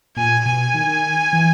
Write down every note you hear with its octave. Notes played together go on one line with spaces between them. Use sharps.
A#2 G#5
B2 G#5
D#3
E3